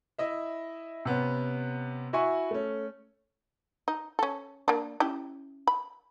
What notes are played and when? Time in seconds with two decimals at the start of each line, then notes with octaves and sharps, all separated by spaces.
0.19 E4 D#5 E5
1.05 C3 B3 C#4
2.13 E4 F#4 E5 G#5 C#6
2.51 A3 C#4
3.88 D#4
4.19 C#4 A4
4.68 A#3 D4
5.00 C#4 E4 G4
5.67 B5